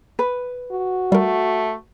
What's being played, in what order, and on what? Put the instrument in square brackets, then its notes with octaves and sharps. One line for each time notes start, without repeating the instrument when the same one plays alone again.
[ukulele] B4
[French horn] F#4
[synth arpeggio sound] G3 A#4 [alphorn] A3